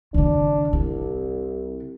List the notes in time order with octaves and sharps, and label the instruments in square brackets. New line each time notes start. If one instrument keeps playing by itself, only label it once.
[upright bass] F#1 D#2 [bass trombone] D4
[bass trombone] C2 [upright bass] C3